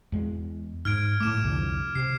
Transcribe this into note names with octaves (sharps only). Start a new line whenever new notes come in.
E2 G#3
G#2 F6 G#6 D7
A2 A3 D6 E7
C2 F2 D3
C3 C7